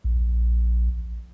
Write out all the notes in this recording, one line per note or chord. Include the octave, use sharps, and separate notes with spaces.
A#1